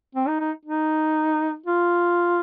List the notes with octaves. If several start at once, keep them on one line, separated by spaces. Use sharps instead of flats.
C4
D#4
D#4
D#4
F4